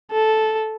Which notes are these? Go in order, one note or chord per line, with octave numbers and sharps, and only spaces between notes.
A4